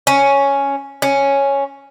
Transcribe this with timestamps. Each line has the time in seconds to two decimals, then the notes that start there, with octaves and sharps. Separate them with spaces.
0.07 C#4
1.02 C#4